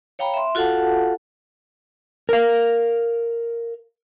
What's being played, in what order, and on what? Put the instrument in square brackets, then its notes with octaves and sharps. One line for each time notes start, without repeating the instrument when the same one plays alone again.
[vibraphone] C#5 F5 G5 A#5 B5
E5 C6
F4 F#4 A4 F5 F#5 A5
[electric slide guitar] A#4 F5